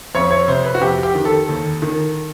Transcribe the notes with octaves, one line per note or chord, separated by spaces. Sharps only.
F2 C#5
C#5
C3 C5
B4
F#4
F2 G4
G4
D#3
A4
D#2
D#3